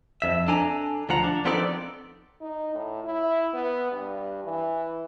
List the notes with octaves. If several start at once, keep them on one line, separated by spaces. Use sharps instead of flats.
F2 E5
D4 A4 G#5 A#5
D2 F3 F#5 A#5
D4
F3 B3 C4 D#4 A4 D5
D#4
A2
E4
B3
G2
E3